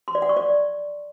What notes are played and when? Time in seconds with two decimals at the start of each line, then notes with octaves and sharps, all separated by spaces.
0.08 C6
0.15 D5
0.22 F#5
0.29 C#6
0.37 D5